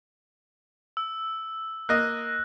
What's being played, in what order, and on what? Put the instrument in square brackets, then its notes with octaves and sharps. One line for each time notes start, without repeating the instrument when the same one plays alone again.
[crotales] E6
[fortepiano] A#3 D#5 [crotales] F#6 A#6